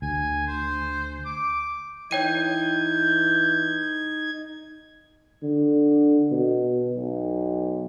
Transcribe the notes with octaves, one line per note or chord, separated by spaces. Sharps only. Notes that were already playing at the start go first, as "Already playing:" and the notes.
D2 G#5
C5
D6
E3 D#4 C#5 G5 G6 G#6 D#7
D3
B2
B1